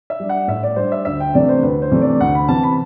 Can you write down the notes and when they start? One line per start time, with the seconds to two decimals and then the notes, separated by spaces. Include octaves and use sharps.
0.10 E5
0.20 G3 D4
0.29 F#5
0.48 A2 E5
0.63 D5
0.76 G3 D4 C5
0.92 E5
1.05 D2 E5
1.20 G5
1.34 C3 E3 A3 D4 D5
1.49 C5
1.63 D2 B4
1.82 C5
1.92 C3 E3 A3 D4
2.02 D5
2.20 D2 F#5
2.35 B5
2.48 C3 E3 A5
2.64 B5